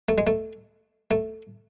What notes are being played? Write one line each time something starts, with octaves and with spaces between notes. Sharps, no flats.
A3
G#3
A3
A3